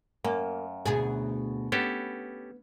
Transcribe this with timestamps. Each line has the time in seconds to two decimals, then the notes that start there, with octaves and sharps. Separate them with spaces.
0.25 F#2 A#3
0.86 D2 B2 G#4
1.72 B3 C#4 G4 A4